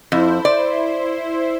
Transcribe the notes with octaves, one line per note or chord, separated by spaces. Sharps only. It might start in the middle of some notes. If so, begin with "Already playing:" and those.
F2 E4 C5
D5